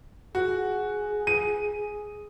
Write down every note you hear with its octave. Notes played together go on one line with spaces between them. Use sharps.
F#4 G#4
D#7